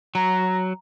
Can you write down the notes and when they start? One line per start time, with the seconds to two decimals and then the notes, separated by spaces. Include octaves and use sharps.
0.15 F#3 A#5